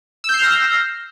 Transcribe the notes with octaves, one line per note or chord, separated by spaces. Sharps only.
E6 F6 G6 A#6 C7